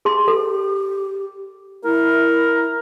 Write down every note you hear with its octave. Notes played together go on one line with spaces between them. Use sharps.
G#4 C6
G4 A4
E4 A#4